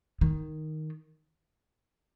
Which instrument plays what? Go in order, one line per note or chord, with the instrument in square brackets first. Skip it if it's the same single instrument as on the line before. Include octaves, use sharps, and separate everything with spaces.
[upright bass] D#3